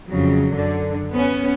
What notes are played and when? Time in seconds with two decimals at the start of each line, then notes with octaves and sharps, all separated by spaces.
0.10 F2 C#3 F#3
0.54 F#2 D3
1.11 B3 C#4